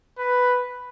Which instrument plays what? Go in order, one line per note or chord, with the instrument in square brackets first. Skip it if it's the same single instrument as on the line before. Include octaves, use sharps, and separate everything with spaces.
[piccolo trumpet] B4